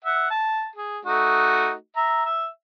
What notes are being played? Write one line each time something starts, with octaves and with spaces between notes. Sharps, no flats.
E5 F#5
A5
G#4
A3 D#4 F#4
E5 A#5
E5